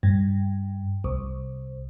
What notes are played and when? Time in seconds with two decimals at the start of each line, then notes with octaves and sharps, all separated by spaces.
0.03 G2
1.04 C2